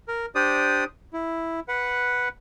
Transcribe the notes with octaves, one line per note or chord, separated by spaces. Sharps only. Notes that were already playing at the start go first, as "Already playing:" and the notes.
A#4
D4 G4 C5 D5 D#6
E4
B4 F#5